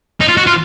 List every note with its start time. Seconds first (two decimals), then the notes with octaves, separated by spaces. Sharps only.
0.20 D#4
0.28 F4
0.37 F#4
0.47 F4